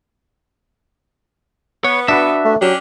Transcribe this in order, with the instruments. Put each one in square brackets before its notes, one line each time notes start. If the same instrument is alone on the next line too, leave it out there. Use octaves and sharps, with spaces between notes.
[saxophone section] B3 [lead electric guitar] C#5
[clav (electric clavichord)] D4 F#4 B4 [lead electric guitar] E5
[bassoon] A3
[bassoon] F#3 [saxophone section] C#4 D4 G4